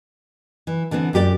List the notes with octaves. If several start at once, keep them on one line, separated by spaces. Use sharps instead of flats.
E3
D3 E3 B3 C4
F#2 A3 G4 A#4 D5